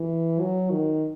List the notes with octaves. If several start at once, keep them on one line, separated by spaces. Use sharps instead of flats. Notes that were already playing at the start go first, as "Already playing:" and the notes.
Already playing: E3
F#3
D#3